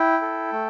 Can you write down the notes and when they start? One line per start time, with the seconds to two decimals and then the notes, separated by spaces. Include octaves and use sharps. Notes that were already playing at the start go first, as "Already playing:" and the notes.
Already playing: E4 G5
0.22 A4
0.53 A3